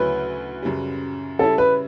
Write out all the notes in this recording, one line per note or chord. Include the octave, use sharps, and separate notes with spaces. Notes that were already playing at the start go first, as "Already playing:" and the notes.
Already playing: D2 C#3 F#3 C#4 E4 B4
F#2 C#3 G3
C#3 G3 C#4 E4 A4
B4